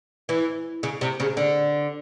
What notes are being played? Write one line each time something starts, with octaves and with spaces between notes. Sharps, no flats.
E3
C#3
C3
C#3
D3